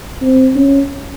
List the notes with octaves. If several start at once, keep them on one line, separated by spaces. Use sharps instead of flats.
C4
C#4